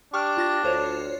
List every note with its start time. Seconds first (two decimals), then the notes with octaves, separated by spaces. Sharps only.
0.14 D4 G4 C#6 D6 F6
0.37 F4 A6 A#6
0.63 D2 F4 C5 C#5